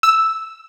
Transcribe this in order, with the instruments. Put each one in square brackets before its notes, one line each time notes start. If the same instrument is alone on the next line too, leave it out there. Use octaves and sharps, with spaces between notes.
[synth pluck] E6